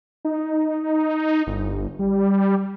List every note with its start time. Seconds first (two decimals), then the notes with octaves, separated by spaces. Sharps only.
0.25 D#4
1.47 G1
1.99 G3